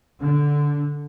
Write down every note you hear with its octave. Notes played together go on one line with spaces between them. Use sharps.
D3